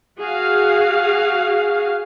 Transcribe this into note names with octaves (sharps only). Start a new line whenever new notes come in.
F#4 G#4 F5